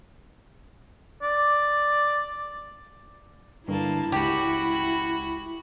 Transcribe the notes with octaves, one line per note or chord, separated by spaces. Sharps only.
D5
G2 D3 A#3 E4 A5
C#2 F#4 G4 B5